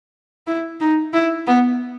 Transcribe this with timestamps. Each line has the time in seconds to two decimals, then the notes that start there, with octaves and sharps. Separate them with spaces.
0.47 E4
0.80 D#4
1.13 E4
1.46 B3